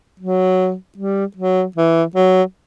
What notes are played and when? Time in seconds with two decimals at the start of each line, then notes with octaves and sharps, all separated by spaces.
0.20 F#3
0.98 G3
1.37 F#3
1.76 E3
2.15 F#3